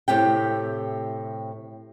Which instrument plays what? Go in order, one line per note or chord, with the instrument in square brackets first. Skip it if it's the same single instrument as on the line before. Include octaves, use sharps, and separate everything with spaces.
[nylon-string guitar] A2 C3 G4 G5